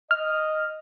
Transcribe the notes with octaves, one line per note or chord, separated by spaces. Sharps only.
D#5 F6